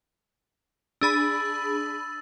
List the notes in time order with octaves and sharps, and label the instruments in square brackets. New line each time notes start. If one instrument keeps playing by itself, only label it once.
[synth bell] D4 G#4 B5 [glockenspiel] E6 A6